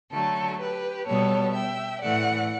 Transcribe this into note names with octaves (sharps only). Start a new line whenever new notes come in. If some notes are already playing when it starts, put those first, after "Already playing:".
D3 F#3 A3 A4
G4 B4
B2 G3 B3 A4 C#5
E5 G5
A2 E3 A3 D5 F#5